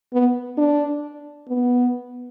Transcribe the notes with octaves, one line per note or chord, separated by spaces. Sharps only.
B3
D4
B3